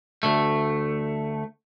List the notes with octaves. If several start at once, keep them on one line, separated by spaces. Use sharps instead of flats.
D2 A3